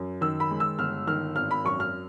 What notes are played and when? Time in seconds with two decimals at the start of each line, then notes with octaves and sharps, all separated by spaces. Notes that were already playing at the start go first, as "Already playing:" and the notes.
Already playing: F#2
0.21 D#3 E6
0.40 B5
0.51 G#3
0.60 E6
0.79 G1 F6
1.07 D#3 F6
1.36 G#1 F6
1.51 B5
1.64 F#2 C#6
1.80 F6